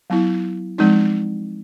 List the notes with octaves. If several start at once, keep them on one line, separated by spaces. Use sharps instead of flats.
F#3 B3 E4
F3 G#3 C4 D#4